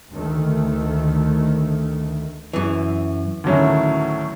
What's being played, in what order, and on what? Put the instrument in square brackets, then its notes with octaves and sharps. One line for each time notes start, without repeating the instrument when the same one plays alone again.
[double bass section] D2 D#3 A3
[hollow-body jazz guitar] F#2 E3
[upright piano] D2 A2 D#3 F#3 A3 C#4